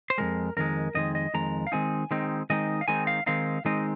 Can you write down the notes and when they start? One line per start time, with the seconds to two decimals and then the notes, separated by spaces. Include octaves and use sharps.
0.10 C5
0.18 F2 D#3 G#3 A#4
0.57 F2 D#3 G#3 A#4
0.95 F2 D#3 G#3 D#5
1.15 D#5
1.34 F2 D#3 G#3 A#5
1.67 F5
1.72 D#3 G#3 C4 D#4 G#5
2.11 D#3 G#3 C4 D#4
2.50 D#3 G#3 C4 D#4 D#5
2.81 F5
2.88 D#3 G#3 C4 D#4 G#5
3.07 F5
3.26 D#3 G#3 C4 D#4 F5
3.65 D#3 G#3 C4 D#4 D#5